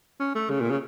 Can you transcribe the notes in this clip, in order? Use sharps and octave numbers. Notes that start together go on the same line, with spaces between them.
C#4
A3
C#3
A#2
C#3